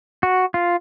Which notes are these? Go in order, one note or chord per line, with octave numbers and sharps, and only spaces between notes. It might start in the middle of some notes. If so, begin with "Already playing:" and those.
F#4
F4